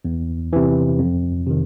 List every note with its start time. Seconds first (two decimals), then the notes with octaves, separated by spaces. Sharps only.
0.05 E2
0.53 C3 E3
0.99 F2
1.46 C3 D#3